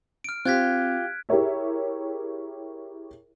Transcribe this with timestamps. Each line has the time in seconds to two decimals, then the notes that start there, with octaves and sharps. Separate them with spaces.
0.24 F6 D7
0.45 C4 F4 G4 F#6 G#6 B6
1.29 E4 G4 G#4 A#4 C#5 E5